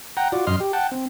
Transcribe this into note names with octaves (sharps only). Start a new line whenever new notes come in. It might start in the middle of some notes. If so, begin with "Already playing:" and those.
F#5 G5 A#5
F4 F#4 D5
F#2 D#5 C6 F6
G4
F#5 G5 A5
C4